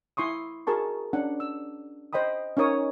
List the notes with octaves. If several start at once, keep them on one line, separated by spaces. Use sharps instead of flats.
E4 C6 C#6 D#6
F#4 G#4 A#4 A5 C#6
C#4 D4 F#5
E6
C5 D#5 G5 B5 D#6
C#4 D#4 A#4 C#5 D#6